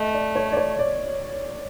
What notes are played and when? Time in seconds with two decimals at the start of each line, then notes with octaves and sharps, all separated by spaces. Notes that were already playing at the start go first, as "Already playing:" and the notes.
Already playing: A3 D#5
0.14 D5
0.36 C#5
0.52 D5
0.57 C#5
0.79 D5